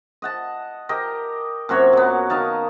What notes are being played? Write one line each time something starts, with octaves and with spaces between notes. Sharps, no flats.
D#5 F#5 A5
G4 A#4 D#5
F#2 C3 F#4 C#5
F#3 B3
D#3 D#4 F5 A5